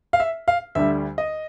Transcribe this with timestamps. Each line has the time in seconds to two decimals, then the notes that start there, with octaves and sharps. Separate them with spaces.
0.13 F5
0.20 E5
0.48 F5
0.75 D2 D3 G3 E5
1.18 D#5